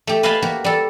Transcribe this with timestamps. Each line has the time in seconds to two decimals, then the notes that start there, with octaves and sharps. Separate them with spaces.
0.07 A3 G4
0.23 B4 D#5 F5 G#5 A5 B5
0.42 A#3 F#4 G4
0.64 G3 A4